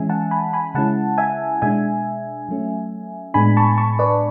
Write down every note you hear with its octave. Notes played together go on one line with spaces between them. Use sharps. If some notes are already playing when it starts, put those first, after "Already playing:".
Already playing: E3 G#3 C#4 E5 G#5
F#5 A5
G#5 B5
G#5 B5
C#3 G#3 C#4 E4 F#5 A5
E5 G#5
B2 G#3 D4 E5 G#5
F#3 A3 C#4
A2 G#3 B3 D4 G#5 B5
A5 C#6
A5 C#6
B4 D5